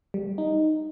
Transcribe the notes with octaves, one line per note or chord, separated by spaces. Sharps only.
G3
D#4